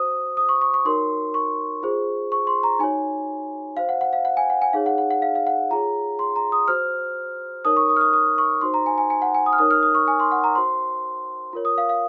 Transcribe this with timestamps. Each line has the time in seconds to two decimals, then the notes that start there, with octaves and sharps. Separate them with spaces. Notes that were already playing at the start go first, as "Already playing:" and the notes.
Already playing: F#4 C5 D#6
0.37 D#6
0.49 C#6
0.61 C#6
0.74 C#6
0.85 D#4 F#4 A#4 C#5 C6
1.34 C#6
1.83 F4 G#4 C5
2.32 C#6
2.47 C6
2.63 A#5
2.79 D#4 F#4 C#5 G#5
3.77 F#4 C5 F5
3.89 F#5
4.01 F#5
4.13 F5
4.25 F#5
4.37 G#5
4.50 F#5
4.62 G#5
4.73 D#4 G#4 C#5 F5
4.86 F#5
4.98 F#5
5.11 F#5
5.22 F5
5.35 F5
5.47 F#5
5.70 F4 G#4 C#5 A#5
6.19 C6
6.36 A#5
6.52 D#6
6.68 F#4 C5 F6
7.65 D#4 A#4 C#5 D#6
7.77 C#6
7.89 D#6
7.96 F6
8.01 D#6
8.13 D#6
8.38 C#6
8.61 D#4 F#4 C5 C6
8.74 A#5
8.86 G#5
8.98 G#5
9.10 G#5
9.22 F#5
9.35 G#5
9.46 D#6
9.53 F6
9.58 D#4 A#4 C#5 D#6
9.71 F6
9.83 D#6
9.95 C#6
10.08 G#5
10.20 C6
10.32 F#5
10.44 A#5
10.55 F#4 C5 C6
11.53 F4 A#4 C#5
11.65 D#6
11.78 F5
11.89 F5